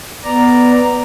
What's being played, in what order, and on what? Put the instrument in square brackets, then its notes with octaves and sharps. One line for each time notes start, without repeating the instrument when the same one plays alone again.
[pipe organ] B3 D5 A#5